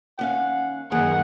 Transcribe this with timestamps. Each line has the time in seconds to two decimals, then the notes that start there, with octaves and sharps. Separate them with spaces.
0.19 D#2 C#4 F5 F#5
0.92 F#2 D#3 A#3 G#4 F#5